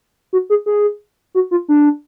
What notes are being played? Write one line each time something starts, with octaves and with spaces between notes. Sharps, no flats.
F#4
G#4
G#4
F#4
F4
D4